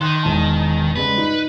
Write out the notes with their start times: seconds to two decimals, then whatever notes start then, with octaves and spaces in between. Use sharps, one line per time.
0.01 D#3 C6 F#6
0.23 E1 A5
0.96 G2 C#3 G#3 B4
1.18 D#4